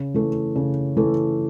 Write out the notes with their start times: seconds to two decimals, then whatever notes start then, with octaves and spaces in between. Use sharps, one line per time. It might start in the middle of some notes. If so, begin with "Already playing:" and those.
Already playing: C#3
0.14 E3 A3
0.56 C#3
0.97 E3 A3